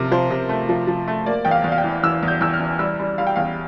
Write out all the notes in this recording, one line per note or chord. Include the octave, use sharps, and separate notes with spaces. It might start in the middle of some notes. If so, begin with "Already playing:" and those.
Already playing: C3 F3 A#4
F3 C5
C3
A3
F3
F3
A3
A#3 D5
E2 G5
F5
E2
F5
G5
E3
E3 E6
E2
G6
E2 E6
F6
E3
G3 E6
G3
G3 F5
G5
E2 F5